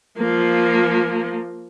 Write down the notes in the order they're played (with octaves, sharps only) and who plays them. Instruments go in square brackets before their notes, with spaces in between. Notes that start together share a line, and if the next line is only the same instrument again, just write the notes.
[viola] F3 A#3